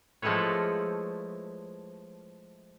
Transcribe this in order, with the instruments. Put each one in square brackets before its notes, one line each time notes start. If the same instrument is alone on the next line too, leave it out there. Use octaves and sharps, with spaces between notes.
[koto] F3 G#3 A3 E4 B4 C#5